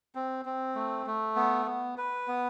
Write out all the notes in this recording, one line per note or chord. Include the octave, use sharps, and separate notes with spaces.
C4
C4
A3
A3
B3
B3
B4
B3